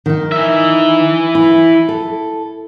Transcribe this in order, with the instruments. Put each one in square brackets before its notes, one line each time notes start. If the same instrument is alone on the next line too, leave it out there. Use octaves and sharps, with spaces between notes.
[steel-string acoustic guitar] D#3 D#4
[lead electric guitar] E3 E5
[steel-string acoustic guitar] E4
A4